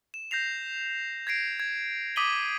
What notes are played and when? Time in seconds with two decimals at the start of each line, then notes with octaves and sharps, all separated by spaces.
0.14 E7
0.31 G6 A#6 C7 F7
1.27 G#6 A#6 C7 D7
1.60 G#6
2.16 D6 D#6 B6 D#7 F#7 G7